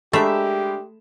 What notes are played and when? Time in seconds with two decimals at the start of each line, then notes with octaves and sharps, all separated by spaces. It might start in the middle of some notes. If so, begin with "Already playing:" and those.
0.13 G#3 A3 D4 G4 A#4 E5 B5 E7